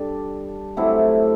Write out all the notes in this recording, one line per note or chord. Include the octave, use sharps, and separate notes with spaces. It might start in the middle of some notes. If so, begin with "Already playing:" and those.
Already playing: G3 D4 A4 D5
C3 F#3 A3 E4